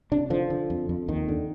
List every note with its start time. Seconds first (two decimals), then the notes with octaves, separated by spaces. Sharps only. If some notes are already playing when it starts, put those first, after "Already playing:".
0.11 C3 D4
0.30 D3 F3
0.50 D3
0.70 F2
0.89 F2
1.08 D#2 D#3
1.29 D3